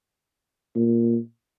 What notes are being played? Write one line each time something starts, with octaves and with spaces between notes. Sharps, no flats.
A#2